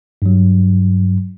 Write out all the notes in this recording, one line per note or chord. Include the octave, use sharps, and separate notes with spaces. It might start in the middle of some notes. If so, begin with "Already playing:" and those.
G2 F#3